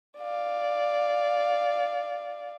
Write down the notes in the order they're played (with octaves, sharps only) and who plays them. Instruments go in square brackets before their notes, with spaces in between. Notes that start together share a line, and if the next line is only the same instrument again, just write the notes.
[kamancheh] D5 F5